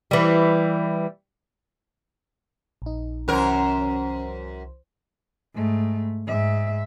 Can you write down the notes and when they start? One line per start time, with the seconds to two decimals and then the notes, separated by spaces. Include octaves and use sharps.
0.11 E3 G3
2.82 A#1 D#4
3.28 C2 F#2 E3 C#4 A#4 C5
5.54 G#2 A3
6.27 G#2 E5